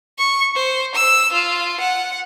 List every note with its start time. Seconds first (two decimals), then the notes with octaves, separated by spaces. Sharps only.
0.18 C#6
0.55 C5
0.95 E6
1.33 F4
1.80 F#5